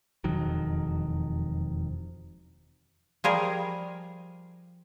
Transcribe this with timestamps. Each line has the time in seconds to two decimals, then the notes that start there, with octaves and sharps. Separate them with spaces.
0.24 E1 F2 D#3 F#3
3.24 F3 G3 G#4 A#4